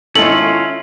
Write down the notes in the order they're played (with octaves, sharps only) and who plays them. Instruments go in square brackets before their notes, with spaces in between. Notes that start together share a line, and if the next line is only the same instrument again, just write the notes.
[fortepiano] G#1 A4 [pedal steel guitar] C#4 F4 [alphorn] E4 [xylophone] F#7